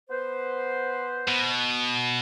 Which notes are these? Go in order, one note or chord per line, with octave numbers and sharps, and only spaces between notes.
B3 B4 C5
B2